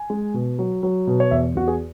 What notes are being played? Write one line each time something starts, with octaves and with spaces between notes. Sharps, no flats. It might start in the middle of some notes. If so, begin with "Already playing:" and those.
Already playing: G#5
G#3
B2
F#3
F#3
B2
C#5
E2 E5
E2 F#4
G#4